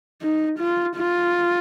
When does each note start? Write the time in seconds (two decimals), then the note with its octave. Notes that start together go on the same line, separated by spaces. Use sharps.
0.22 D#4
0.59 F4
0.97 F4